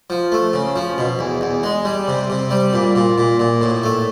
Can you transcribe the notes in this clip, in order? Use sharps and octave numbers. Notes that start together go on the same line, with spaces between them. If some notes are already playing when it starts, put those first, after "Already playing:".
F3
A3
C#3
F3
B2
E2
E2
G#3
G3
C3
C3
G3
A#2
A#2
A#2
A#2
A2
A3